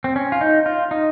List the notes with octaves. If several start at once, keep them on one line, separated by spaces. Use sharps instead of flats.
C4
C#4
F4
D#4
F4
D#4